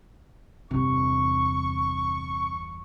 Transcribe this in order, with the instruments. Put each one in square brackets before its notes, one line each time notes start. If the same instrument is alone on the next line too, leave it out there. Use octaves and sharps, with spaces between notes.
[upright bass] G1 E2 [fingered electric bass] C3 C4 [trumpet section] C#6